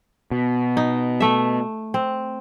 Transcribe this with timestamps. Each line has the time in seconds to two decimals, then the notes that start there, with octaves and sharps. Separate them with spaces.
0.31 B2
0.77 D#4
1.20 A3 E5
1.94 C4